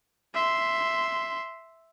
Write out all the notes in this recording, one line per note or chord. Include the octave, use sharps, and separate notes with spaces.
E5 C6